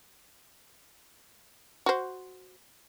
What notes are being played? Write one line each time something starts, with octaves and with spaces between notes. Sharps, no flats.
F#4 C5